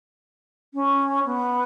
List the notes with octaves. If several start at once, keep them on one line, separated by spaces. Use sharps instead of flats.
C#4
B3